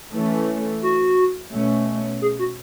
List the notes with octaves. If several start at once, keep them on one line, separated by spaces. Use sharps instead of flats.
E3 A3 C#4
F#4
B2 A3 C#4
G#4
F#4